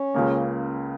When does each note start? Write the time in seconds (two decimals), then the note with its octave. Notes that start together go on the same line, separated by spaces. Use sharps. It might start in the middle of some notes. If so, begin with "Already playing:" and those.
Already playing: C#4
0.14 C#2 C#3 A#3